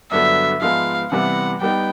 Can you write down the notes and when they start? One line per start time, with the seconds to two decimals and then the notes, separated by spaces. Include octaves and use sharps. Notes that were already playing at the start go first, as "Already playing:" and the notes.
0.11 G2 D3 F#3 B3 E5
0.61 G#2 F3 G#3 B3 F5
1.12 C3 E3 G3 B3 E4 F#5
1.61 G3 B3 D#4 G5